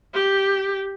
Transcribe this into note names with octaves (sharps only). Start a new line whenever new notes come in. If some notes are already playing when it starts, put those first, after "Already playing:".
G4